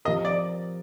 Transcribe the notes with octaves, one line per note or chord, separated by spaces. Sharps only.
F3 C4 G4 A#4 D#5
D5